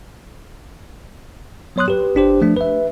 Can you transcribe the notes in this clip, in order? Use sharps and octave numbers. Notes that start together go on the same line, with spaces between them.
F#3 B3 C#5 C6 D#6 F#6
G4 B4
G1 D4 G4 C5
F3 A3 D4
B4 E5